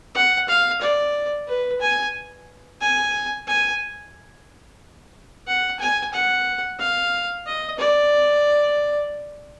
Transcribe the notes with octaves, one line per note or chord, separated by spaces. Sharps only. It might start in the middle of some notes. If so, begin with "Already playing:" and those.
F#5
F5
D5
B4
G#5
G#5
G#5
F#5
G#5
F#5
F5
D#5
D5